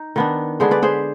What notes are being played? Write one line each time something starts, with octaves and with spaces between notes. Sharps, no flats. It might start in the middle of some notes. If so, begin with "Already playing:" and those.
Already playing: D#4
D#3 B3 D4
D3 G#3 B3 D4 G#4 C5
B4 D5
G#4 C5